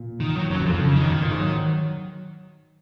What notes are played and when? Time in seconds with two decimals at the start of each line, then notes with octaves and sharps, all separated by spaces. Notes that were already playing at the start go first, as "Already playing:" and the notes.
Already playing: A#2
0.20 D#3
0.36 F#3
0.50 F#2 F#3
0.60 F#2
0.66 F2 F3
0.80 F2 C#3
0.96 F#2 D#3
1.11 A#2
1.21 A#2
1.31 G#2
1.40 F#3